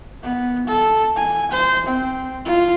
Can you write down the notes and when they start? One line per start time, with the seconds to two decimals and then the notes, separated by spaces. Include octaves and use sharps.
0.23 B3
0.67 A4
1.17 G#5
1.51 C5
1.86 C4
2.45 F4